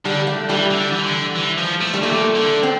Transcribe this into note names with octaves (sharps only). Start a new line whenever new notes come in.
D3 G3
A3
E3 G3
D3
E3
D3
E3
F3
A3
G3
A#2 A3
D3
C4